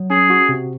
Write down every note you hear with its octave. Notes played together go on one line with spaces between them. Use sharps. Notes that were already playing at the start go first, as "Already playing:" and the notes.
Already playing: F#3
C#4 G#4
F#4
C3